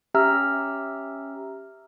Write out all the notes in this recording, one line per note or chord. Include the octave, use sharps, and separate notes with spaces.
C#4 G4 E5 A#5 E6 F6